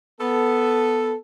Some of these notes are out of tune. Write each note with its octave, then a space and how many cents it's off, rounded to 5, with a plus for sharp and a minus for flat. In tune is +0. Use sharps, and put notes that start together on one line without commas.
B3 +0 A4 +0